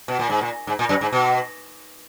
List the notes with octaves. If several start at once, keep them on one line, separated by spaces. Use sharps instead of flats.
B2
A#2
G#2
A#2
G#2
A#2
F#2
G#2
B2